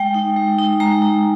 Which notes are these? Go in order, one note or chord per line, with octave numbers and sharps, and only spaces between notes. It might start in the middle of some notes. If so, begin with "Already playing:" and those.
Already playing: G#3 G5
D#4
G#3
D#4
G#3 A#5
D#4